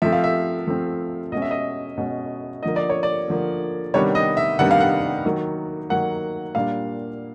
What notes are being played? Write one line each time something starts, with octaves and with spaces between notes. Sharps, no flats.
F3 A3 C4 E5
F5
E5
F3 A3 C4
B2 G#3 C#4 D#5
E5
D#5
B2 G#3 C#4
D3 F3 A#3 D#5
D5
C#5
D5
D3 F3 A#3
C3 D#3 G3 B3 D4 C#5
D#5
E5
C3 D#3 G3 B3 D4 F#5
F5
F#5
D#3 F#3 A#3
D#3 F#3 A#3 F#5
A#2 G3 A#3 D4 F5